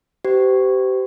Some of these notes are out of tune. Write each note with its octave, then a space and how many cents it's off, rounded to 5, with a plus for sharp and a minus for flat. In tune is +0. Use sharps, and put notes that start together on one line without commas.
G4 -25 C5 -35